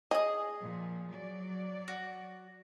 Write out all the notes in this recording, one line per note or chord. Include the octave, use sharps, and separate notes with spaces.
G#4 D#5 D#6
A#2 F3
F#3 D5
F#4